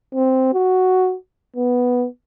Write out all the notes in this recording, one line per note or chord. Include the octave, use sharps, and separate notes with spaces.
C4
F#4
B3